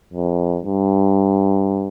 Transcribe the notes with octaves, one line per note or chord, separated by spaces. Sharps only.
F2
G2